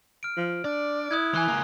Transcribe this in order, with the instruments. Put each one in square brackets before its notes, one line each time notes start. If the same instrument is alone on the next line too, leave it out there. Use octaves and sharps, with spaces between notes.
[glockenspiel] F6 D7
[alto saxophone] F3
[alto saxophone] D4 [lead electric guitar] D5
[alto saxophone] E4 [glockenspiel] D#6 F#6 G#6
[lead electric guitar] E3 [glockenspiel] G#5 F#6 G7
[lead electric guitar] C#2 A#3